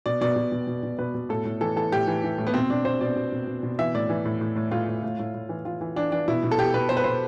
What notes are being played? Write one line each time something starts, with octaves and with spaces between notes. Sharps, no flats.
B2 D5
B2 D5
B2
B2
B2
B2
B2 B4
B2
A2 A4
A2
E3 A4
E3 A4
A2 G4
E3
E3
A2
B3
B2 C4
B2 D4
B2 C5
B2 D5
B2
B2
B2
B2
E3 E5
A2 D5
E3
A2
A2
A2
A2 F4
A2
A2
A2
A2
E3
E3 F4
E3
E3 D4
E3 D4
B2 E4
B2
A4
B2 G4
B2 B4
B2 C5
B4
B2 C5